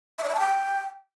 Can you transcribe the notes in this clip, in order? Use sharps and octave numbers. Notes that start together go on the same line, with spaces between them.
E5
D5
E5
A5
G5